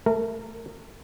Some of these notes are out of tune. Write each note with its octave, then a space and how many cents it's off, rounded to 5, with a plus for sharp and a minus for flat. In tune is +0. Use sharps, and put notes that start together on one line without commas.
A3 +0 A#4 -30